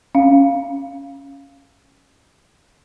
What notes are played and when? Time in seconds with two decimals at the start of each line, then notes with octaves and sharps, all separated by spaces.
0.15 C#4 F5